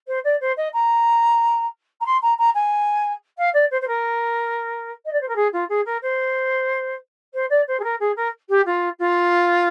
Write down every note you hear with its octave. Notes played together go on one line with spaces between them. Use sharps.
C5
D5
C5
D#5
A#5
A#5
C6
A#5
A#5
G#5
F5
D5
C5
C5
A#4
D#5
D5
C5
A#4
G#4
F4
G#4
A#4
C5
C5
D5
C5
G#4
A#4
G#4
A#4
G4
F4
F4